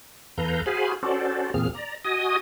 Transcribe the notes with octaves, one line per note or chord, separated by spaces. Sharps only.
E2 A4 B4 F5 A#5 G6
F#4 G#4 C5 F5 G#5 B5
C#4 F#4 A4 C5 D5
E2 A#2 A#3 C4 G#4 F6
D5 A#5
F#4 D#5 G#5 D#6